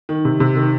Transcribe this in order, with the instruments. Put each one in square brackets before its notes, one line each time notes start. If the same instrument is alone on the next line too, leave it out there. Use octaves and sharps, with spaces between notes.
[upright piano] D#3
C3
C3
D#3